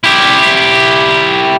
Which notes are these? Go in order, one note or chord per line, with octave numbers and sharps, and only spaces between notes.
E4 G4